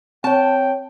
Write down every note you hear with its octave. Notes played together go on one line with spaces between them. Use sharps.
C4 C#5 G5 A5